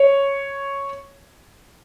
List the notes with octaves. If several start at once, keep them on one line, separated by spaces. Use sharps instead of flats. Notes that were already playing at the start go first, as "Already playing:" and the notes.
Already playing: C#5